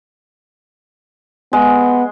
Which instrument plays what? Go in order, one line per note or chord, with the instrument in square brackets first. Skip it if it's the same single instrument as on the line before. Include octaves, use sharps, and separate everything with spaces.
[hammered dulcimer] G#3 [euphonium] B3